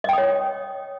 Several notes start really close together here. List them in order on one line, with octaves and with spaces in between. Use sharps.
D#5 G5 D#6 C#5